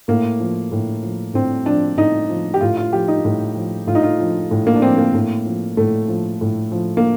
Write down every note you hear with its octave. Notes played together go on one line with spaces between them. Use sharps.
A2 A#3
F3
A2
F3
A2 C4
F3 D4
A2 D#4
F3
G4
A2 F4
F4
F3 G4
D#4
A2
F3
A2 F4
D#4
F4
F3
A2
A#3
D4
F3 C4
A#3
A2
F3
A2 A3
F3
A2
F3
A#3